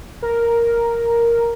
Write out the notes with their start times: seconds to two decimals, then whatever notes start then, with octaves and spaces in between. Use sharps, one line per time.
0.22 A#4